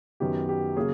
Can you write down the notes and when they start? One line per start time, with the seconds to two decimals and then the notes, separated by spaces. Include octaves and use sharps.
0.20 F#2 D#3 F#3 B3 G4
0.49 G4
0.76 C#3 F#3 A#3 C#4 G#4